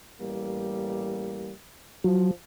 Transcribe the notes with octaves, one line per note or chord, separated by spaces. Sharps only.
A1 G3 A#3
F3 F#3